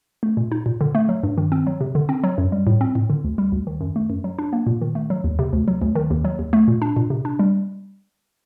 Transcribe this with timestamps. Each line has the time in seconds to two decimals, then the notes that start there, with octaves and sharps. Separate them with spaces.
0.23 A3
0.37 A#2
0.52 D#4
0.66 A#2
0.81 D3
0.95 A3
1.09 F#3
1.23 G2
1.38 D#3
1.52 C4
1.67 F#3
1.81 C3
1.95 D3
2.09 C4
2.24 F#3
2.38 F#2
2.52 G3
2.67 A2
2.81 C4
2.95 A2
3.10 D3
3.24 D2
3.38 G3
3.52 D2
3.67 D#3
3.81 F#2
3.96 A3
4.10 F#2
4.24 F#3
4.39 D4
4.53 A#3
4.67 A#2
4.81 D#3
4.95 A3
5.10 F#3
5.24 D#2
5.39 C3
5.53 D2
5.68 F#3
5.81 D2
5.95 D#3
6.10 D#2
6.25 F#3
6.39 D#2
6.53 A3
6.68 A#2
6.82 D4
6.97 A#2
7.10 C3
7.25 D4
7.39 G3